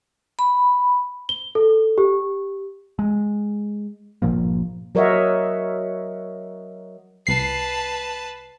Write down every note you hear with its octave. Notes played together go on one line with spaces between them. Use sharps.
B5
G7
A4
G4
G#3
G1 A#2 F3 A#3
F#3 A#4 C#5 D#5 E5 F#5
C2 B4 A5 C7